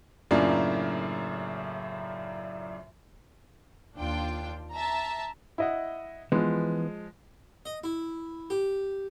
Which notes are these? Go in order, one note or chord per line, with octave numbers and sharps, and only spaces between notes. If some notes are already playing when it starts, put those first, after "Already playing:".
F#2 A2 C#3 A#3 D4 F4
D#2 D4 F4 G5
E5 A5 A#5
E4 D#5 F#5
E3 F3 G#3 B3
D#5
E4
G4